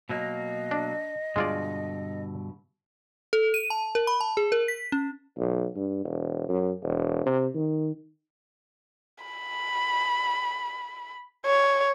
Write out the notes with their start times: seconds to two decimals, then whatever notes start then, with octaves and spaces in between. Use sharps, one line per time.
0.09 B2 F#3 A#3 D#5
0.71 D4
1.36 G2 B2 D3 G#3 F4 D5
3.33 A4
3.54 D#7
3.70 A5
3.95 A#4
4.07 B5
4.21 A5
4.37 G#4
4.52 A#4
4.68 B6
4.92 C#4
5.38 B1
5.76 G2
6.04 E1
6.49 F#2
6.83 E1
7.26 C3
7.55 D#3
9.24 B5
11.46 C#5